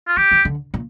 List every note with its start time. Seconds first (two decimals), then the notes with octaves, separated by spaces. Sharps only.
0.08 F4
0.17 E3 G4
0.31 E3
0.45 D3
0.74 A#2